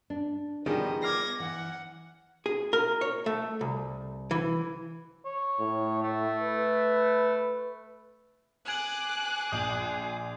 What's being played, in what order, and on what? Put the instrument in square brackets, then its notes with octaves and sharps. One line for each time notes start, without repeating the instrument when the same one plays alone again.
[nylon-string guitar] D4
[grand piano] D#3 F3 G3 [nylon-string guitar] B3 G#4 D5 [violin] D#5
[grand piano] D6 F6 C7 [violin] G#6 A#6
[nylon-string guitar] E3 [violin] F#5
[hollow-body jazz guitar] G#4
A#4
C#5
A3
C2
E3
[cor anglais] C#5
[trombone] A2
[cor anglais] A3
[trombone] B4
[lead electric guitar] G#4 [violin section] D6 F#6 [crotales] G#6 D7 F#7
[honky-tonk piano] A#1 [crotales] D#6 G6